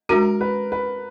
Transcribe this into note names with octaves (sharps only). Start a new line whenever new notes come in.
G#3 D4 F#4 A#4
B4
B4